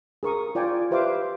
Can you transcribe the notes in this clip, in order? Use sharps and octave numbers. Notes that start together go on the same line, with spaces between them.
G#4 A#4 C#6 D#6
F4 D5 G5 G#5
G4 B4 C5 E5 F5 D6